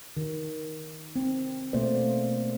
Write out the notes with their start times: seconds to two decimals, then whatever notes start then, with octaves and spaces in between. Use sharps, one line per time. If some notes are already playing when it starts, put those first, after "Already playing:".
0.17 D#3
1.16 C4
1.73 B2 A3 A#3 C5 D5